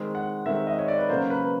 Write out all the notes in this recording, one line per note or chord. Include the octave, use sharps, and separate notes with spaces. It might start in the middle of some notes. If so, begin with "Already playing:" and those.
Already playing: D#3 G#3 C4
F#5
D#3 G#3 C4 E5
D#5
C#5
D5
B4
C#3 F#3 A#3 C5
B4